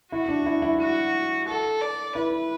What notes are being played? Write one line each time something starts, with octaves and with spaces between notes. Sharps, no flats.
E4 F#4
D4
E4
E4
F#4
A4
D5
E4 B4